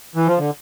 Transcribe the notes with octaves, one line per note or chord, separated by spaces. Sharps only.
E3
F3
D3